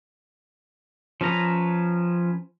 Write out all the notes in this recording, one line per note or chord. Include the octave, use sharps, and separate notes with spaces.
F3 C#4 B4 A#5